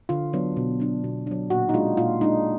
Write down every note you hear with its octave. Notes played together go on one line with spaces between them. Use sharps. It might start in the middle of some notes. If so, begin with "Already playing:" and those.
D3 F4
F#3 B3 D4
B2
F#3 D4
B2
F#3 D4
A#2 F#4
D#4
G#3 D4 F4
A#2 F4
G#3 D4 D#4